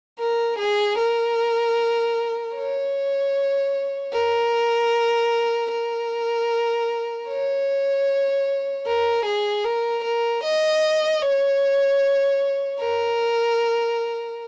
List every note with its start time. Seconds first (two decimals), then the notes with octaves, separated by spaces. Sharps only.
0.19 A#4
0.58 G#4
0.98 A#4
2.55 C#5
4.13 A#4
5.71 A#4
7.28 C#5
8.86 A#4
9.25 G#4
9.64 A#4
10.04 A#4
10.43 D#5
11.22 C#5
12.80 A#4